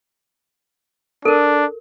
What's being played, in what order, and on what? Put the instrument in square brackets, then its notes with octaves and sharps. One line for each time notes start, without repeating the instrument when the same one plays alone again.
[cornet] D4 [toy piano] A4 A#4